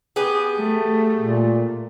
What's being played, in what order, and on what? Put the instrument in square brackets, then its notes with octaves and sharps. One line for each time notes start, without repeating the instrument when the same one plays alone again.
[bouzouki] B3 G4 G#4
[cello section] A3
[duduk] A#2